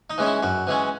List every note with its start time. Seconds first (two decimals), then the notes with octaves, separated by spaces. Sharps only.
0.10 D#4
0.18 E3 G#3 C#4
0.26 E4
0.43 F#2 F#4
0.67 E3 G#3 C#4